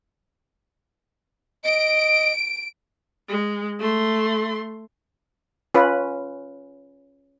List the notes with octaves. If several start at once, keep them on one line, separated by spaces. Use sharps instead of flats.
D#5 D7
G#3
A3 C6
C#4 F4 B4